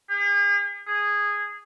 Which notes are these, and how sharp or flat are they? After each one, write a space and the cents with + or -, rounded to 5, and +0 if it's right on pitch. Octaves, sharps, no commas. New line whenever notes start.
G#4 -45
G#4 -10